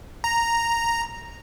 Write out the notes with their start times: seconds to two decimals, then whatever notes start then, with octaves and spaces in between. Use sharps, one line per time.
0.24 A#5